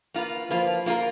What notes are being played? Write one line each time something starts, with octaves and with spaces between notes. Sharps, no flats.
A#3 F4 B4
F3 A#3 F4 B4
A#3 F4 A#4